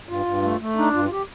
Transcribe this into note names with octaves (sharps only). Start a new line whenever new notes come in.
G2 F4
G2
A3
A3
D4 D#4
G2 F4
F4
G4